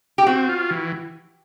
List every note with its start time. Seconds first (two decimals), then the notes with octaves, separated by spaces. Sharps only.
0.18 G4
0.26 C4 F#4
0.49 F4
0.71 E3